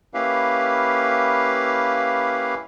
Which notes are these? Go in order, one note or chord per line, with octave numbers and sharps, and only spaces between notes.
A#3 C#4 E4 G4 B4 F5